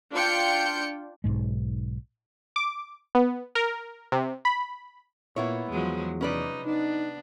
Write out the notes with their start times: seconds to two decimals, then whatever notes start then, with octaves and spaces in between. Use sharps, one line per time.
0.14 D4 F4 G5 G6 C#7
1.24 B1 G#2 G#3
2.56 D6
3.15 B3
3.55 A#4
4.12 C3
4.45 B5
5.36 A#2 A#3 B3 E4 C#5
5.70 E2 F3 F#3 G#3
6.21 C3 C#4 D#4 B4 D5
6.66 B3 D4 D#4